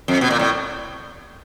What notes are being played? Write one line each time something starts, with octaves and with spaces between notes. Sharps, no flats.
F2
B2
A#2
A2